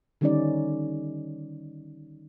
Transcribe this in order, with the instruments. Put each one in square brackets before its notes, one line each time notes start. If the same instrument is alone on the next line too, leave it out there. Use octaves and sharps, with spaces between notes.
[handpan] D3 D#3 G3 C#4 D#4 D5